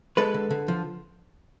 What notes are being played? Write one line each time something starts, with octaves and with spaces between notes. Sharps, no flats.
G#3 A4 B4
D3
D3
F3